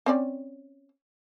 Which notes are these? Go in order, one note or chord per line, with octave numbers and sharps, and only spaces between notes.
C4 C#4 D5